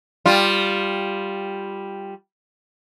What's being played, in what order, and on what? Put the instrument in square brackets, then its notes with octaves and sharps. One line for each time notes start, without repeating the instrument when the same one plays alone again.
[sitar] G3 F4